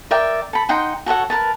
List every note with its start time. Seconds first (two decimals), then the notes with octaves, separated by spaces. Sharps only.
0.11 A#4 D5 E5 G5
0.53 A4 B5
0.69 D#4 F#5 G5 C6
1.06 F#4 A4 C#5 F#5
1.30 A#4 B4 A5